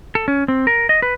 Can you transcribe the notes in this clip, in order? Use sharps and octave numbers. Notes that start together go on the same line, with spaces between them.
A4
C#4
C4
A#4
D#5
B4